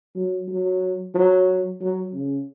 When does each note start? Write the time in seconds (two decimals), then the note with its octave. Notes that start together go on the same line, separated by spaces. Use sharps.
0.16 F#3
0.48 F#3
1.15 F#3
1.81 F#3
2.13 C#3